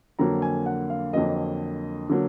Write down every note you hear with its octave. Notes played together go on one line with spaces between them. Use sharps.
F2 D3 F#3 A#3 A#5
G#5
F#5
F5
F2 D3 F#3 A#3 D#5
D3 F#3 A#3